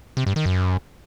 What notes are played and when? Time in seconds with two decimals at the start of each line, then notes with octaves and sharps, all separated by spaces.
0.17 C3
0.26 G2
0.36 D#3
0.46 F#2